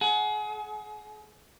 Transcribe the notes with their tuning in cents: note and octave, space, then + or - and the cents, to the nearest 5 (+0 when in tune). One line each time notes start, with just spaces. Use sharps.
G#4 +30 F#5 +0